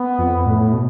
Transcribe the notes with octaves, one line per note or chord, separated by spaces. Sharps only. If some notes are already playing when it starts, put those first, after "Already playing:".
Already playing: B3
F2
A2
B2